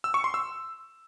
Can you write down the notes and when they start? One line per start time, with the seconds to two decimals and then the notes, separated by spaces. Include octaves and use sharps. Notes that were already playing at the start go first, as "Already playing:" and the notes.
0.04 E6
0.14 C#6
0.24 C6
0.34 E6